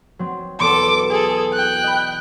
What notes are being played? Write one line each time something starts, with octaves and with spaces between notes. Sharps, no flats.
F#3 C4
E1 B3 A4 C6 D6
G#4 A4
G5 F#6
D#5 B5